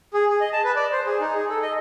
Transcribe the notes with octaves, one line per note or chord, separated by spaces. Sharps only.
G#4
G#4
D#5
A5
B4
D5
C5
G#4
D#4
G#4
A4
D#5